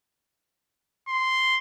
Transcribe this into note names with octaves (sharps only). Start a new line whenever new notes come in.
C6